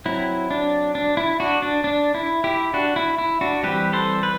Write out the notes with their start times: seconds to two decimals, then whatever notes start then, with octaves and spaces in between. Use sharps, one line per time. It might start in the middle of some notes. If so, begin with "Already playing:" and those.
0.06 F#3 C4 E4
0.51 D4
0.95 D4
1.17 E4
1.40 D4 F#4
1.62 D4
1.84 D4
2.14 E4
2.44 E4 G4
2.74 D4 F#4
2.96 E4
3.18 E4
3.41 D4 F#4
3.63 E3 G3 C4 G4 B4
3.93 A4 C5
4.23 B4